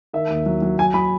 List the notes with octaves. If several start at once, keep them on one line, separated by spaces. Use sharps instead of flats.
D#3 E5
D#2
F#3
F#3
F#3 G#5
F#3 B5